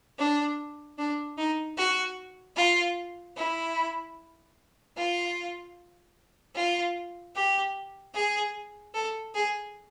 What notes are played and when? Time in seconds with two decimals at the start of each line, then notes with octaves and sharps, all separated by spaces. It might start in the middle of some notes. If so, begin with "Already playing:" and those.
0.18 D4
0.98 D4
1.38 D#4
1.77 F#4
2.57 F4
3.37 E4
4.96 F4
6.56 F4
7.35 G4
8.15 G#4
8.94 A4
9.34 G#4